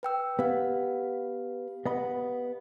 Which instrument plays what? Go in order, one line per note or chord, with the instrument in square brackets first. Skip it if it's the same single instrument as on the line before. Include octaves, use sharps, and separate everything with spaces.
[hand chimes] B4 G5 E6
[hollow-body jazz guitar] B3 [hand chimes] G4 F5
[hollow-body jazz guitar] B3 D#5 B5